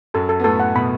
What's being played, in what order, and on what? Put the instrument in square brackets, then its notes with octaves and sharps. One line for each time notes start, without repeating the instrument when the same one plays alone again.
[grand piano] F#2 F#3 [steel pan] A4
[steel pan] A4
[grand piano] B3
[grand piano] A2 A3 [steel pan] A4
[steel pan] F#5
[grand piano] B2 B3 [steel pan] B5